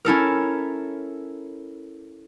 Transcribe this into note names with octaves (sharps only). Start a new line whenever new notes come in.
C#4 E4 A4 A#4